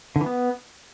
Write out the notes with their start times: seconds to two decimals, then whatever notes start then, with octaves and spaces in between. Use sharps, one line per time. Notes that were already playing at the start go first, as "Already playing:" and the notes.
0.16 D3
0.21 E3
0.26 B3